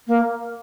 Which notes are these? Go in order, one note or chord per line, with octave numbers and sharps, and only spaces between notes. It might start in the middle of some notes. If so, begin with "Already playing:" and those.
A#3